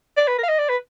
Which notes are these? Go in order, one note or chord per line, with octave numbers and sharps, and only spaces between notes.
D5
B4
A#4
F5
D#5
D5
B4